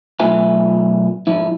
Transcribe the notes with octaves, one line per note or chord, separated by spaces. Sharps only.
B1 A3 F4 B4 E5 G#5
G#2 F3 E4